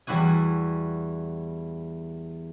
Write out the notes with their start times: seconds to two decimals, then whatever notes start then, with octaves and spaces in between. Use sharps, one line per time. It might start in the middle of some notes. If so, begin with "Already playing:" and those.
0.07 E2 G3 E4 F#4 G#5